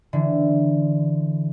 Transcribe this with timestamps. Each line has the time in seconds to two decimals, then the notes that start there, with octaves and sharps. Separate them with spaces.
0.13 D3 E3